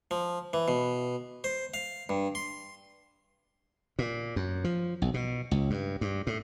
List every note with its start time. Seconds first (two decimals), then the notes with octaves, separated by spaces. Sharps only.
0.11 F3
0.53 E3
0.68 B2
1.44 C5
1.74 F5
2.09 G2
2.35 C6
3.99 A#2
4.36 F#2
4.64 F3
5.02 B1
5.14 B2
5.51 C#2
5.70 G2
6.01 G2
6.27 A2